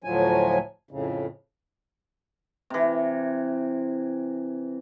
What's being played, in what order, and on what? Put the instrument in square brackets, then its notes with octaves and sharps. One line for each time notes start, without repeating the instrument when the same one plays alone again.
[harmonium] D2 A2 F3 F#3 G#5
F2 A2 C#3
[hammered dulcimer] C3 E3